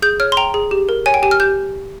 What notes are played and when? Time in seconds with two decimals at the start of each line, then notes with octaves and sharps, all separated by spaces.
0.02 G#4 G6
0.20 C#5 F6
0.32 C6
0.37 G5 A#5
0.54 G#4
0.71 G4
0.89 A#4
1.06 C#5 G#5
1.14 G5
1.23 G4 G#5
1.31 F6
1.40 G4 G6